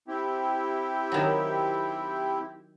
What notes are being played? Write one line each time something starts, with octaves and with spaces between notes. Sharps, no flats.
C4 E4 G4
D#3 F#3